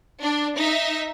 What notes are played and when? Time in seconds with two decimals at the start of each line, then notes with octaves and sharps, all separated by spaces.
0.21 D4
0.58 D#4 E5